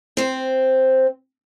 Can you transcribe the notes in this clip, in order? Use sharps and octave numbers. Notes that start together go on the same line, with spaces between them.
C4 C5